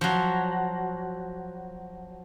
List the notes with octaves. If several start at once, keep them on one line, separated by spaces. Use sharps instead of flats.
F3 F#3